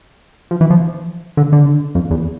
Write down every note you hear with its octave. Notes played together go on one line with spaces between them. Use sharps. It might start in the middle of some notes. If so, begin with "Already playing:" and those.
F3
E3
F3
D3
D3
F2
E2